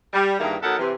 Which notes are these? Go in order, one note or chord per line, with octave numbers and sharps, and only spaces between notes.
G3
G2 D#3 E3 A#3 G#4 E5
F#3 B3 D#4 A4 A#4 F#5
C3 E3